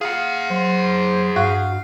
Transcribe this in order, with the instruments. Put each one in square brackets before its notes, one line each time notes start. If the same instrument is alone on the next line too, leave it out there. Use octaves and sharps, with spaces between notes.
[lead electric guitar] G#4 F#5 [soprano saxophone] F5
[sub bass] F#3 [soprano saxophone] C5
[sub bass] G2 [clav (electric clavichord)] F#4 [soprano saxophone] F5